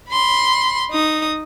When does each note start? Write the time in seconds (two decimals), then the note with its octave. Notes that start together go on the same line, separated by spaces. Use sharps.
0.11 B5 C6
0.91 D#4 D#6